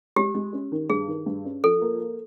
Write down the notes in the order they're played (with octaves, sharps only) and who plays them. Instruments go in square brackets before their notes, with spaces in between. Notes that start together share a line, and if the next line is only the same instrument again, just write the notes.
[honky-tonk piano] G#3 [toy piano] G4
[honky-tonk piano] G#3
C#4
D#3
[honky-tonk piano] G2 [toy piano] G#4
[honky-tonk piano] D#3
G2
C#4
[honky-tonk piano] F3 [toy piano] A4
[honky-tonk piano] A#3
A#3